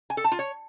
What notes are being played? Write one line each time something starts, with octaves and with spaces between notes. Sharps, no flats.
G#5
A4
A5
F4
C#5